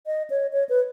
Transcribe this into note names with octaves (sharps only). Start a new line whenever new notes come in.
D#5
C#5
C#5
B4